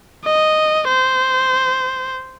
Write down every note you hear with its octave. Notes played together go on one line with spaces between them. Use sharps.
D#5
C5